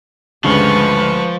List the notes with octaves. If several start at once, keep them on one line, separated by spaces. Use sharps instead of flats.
D2 G2 C#3 F3 G#3 B4 C#6